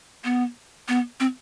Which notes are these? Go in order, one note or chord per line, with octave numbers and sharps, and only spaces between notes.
B3
B3
C4